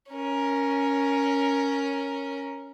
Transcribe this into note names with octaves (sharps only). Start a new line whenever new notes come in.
C#4 A#4